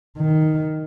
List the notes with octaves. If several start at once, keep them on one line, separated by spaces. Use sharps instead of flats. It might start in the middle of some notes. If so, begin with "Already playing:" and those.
D#3